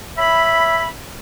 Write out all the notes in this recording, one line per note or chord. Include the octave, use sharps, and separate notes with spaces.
C#5 E5 B5